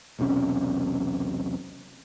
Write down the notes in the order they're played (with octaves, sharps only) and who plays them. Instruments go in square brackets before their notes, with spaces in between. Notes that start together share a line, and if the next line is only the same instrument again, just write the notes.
[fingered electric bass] E1 B1 C3 C#4